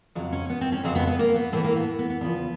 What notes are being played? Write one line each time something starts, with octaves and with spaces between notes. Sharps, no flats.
F2 C#3 F#3
C#4
B3
C4
C#4
F2 C#3 F#3 C4
B3
B3
A#3
B3
A2 E3 A3 C4
A#3
B3
B3
B3
E2 C#3 F3 B3